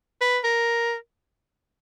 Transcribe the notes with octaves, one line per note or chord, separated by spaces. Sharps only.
B4
A#4